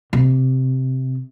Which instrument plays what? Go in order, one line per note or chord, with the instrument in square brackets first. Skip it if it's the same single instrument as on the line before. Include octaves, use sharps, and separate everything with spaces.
[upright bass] C3